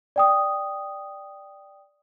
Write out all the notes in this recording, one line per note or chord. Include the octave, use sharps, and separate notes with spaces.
D5 G5 D#6